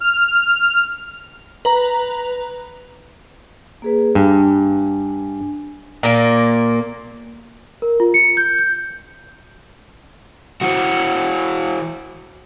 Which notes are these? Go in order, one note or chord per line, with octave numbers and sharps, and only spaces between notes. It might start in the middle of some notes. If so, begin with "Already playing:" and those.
F6
B4 A#5
A#3 G#4 B4
G2 D4 G#5
A#2 A#3
A#4
F4
C#7
G6
G6
E3 F#4